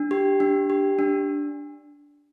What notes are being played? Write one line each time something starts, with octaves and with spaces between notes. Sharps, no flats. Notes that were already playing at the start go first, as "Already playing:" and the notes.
Already playing: D4
G4
D4
G4
D4